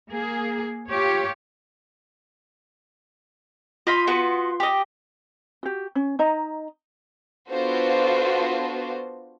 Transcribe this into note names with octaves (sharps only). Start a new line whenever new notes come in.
A#3 G#4
F4 G4 C#5
F4 D#5 F5 B5 C6
B3 F#4 B4
G4 D#5
F#4 G4
C#4
D#4 D#5 A#5
B3 D4 F4 F#4 A4 C5